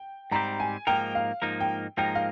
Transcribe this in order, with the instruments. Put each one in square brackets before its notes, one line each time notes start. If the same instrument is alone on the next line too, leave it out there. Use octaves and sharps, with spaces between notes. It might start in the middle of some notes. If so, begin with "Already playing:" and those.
Already playing: [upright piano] G5
[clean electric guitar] G#2 G3 C4 G4 [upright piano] A#5
[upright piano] G#5
[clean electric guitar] G#2 F3 A#3 D#4 A#4 [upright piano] G5
[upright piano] F5
[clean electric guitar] G#2 F3 A#3 D#4 A#4
[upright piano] G5
[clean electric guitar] G#2 F3 A#3 D#4 A#4 [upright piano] G5
[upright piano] F5